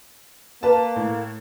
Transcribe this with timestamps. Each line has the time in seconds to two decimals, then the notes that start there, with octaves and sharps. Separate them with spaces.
0.63 A#3 B4 A5
0.96 A2